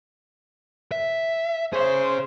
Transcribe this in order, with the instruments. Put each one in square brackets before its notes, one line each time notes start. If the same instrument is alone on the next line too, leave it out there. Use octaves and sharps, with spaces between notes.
[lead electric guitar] E5
[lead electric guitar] G#4 C#5 [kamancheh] C5